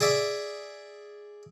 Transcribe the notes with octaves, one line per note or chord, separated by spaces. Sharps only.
G#4 D5 E5